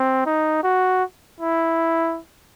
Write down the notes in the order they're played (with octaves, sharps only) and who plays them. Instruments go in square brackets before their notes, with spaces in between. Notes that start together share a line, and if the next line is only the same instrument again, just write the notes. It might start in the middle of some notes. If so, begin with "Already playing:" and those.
Already playing: [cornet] C4
D#4
F#4
E4